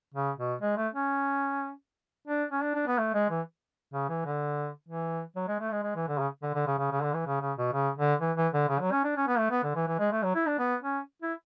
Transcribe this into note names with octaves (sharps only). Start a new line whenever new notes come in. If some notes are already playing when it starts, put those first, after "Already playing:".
C#3
B2
G#3
A3
C#4
D4
C#4
D4
D4
B3
A3
G#3
E3
C#3
E3
D3
E3
F#3
G#3
A3
G#3
G#3
E3
D3
C#3
D3
D3
C#3
C#3
C#3
D3
E3
C#3
C#3
B2
C#3
D3
E3
E3
D3
C#3
F#3
C#4
D4
C#4
B3
A3
B3
D3
E3
E3
G#3
A3
F#3
E4
D4
B3
C#4
E4